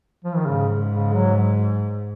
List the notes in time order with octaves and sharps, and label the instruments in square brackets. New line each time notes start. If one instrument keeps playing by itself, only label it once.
[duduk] F3
D#3
[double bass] G#2 [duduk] C#3
[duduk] C#3
F#3